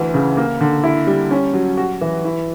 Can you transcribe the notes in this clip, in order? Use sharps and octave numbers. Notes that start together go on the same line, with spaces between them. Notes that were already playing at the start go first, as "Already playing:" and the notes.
Already playing: D2 E3
C#3
A#3
D3
E4
G3
C#4
F#3
F#4
E3
E4